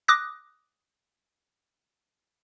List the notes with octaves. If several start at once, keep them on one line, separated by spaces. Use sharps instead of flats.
D6 D#6 F#6 A#6